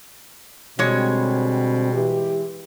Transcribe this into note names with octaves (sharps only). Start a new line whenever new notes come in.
B2 D3 G3 G#3 C4 C#5
E3 G4